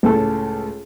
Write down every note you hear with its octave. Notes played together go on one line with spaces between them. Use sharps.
C#2 A2 A4